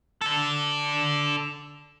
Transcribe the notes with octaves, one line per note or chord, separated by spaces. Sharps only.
D4 A4